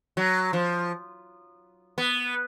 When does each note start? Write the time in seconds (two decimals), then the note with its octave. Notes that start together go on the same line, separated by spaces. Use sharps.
0.17 F#3
0.53 F3
1.98 B3